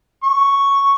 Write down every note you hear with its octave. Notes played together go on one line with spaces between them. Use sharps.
C#6